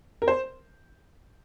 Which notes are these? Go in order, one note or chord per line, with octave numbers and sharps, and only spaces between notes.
A#4
C5